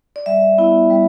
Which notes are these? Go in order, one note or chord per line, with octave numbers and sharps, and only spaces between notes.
D5
G3 E5
B3 E4
G3